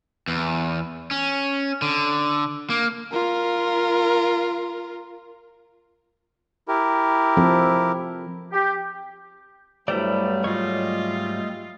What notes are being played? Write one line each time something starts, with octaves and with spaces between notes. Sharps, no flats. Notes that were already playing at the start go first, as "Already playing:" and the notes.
E2
C#4
D3
A#3
F4 A#4
E4 G4 A#4
F3 C4 A4
G4
G2 F#3 G3 A3 B3 E4 C5 D5
G#2 F#3 F4 C#5 D#5